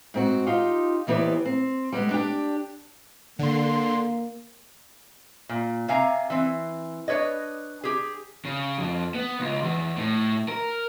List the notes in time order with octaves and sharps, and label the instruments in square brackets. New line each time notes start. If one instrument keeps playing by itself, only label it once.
[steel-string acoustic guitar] G#2 C4 F#4
D#4 F4 G4
D#2 E3 B3 G4 C5 D5
C4
G3 G#3 B3
D4 G4
[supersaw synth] D3 C6 [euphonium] A#3
[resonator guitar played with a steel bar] A#2
C3 F5 G#5 A#5
E3 C4
D4 B4 C#5 D#5
G4 G#4
[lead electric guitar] C#3
F2
B3
C#2
E2
A2
A#4